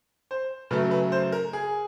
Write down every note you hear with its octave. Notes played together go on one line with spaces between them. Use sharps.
C5
C#3 F#3 A3 B4
B4
C5
A#4
G#4